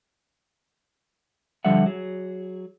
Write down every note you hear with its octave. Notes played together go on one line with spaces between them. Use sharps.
D3 F3 G3 A4 E5 F#5
F#3 G#4